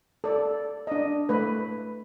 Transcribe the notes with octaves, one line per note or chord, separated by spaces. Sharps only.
A4 D5
D4 D#5
A3 B4